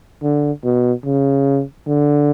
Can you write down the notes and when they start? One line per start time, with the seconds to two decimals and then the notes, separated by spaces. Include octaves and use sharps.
0.23 D3
0.64 B2
1.05 C#3
1.87 D3